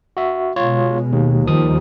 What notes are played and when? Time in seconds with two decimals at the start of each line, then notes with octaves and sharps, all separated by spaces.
0.17 F#4 E5
0.56 B2 G#3 F4 C#5
1.12 D#2
1.47 D#2 D#3 F3 G3 D#6